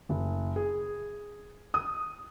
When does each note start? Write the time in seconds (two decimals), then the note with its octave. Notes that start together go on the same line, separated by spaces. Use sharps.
0.09 F#1
0.56 G#4
1.74 D#6